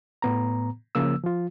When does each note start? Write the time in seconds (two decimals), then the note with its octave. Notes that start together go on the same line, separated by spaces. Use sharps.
0.22 A2 B3 A#5
0.95 C#3 F3 A#3 E6
1.23 F3 F4